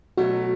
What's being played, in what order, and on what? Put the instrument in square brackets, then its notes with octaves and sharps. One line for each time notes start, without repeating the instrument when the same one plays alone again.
[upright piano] B2 F#3 A3 [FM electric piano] F#4